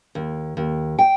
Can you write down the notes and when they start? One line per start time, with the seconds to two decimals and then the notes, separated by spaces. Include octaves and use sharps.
0.15 D#2
0.57 D#2
0.99 G5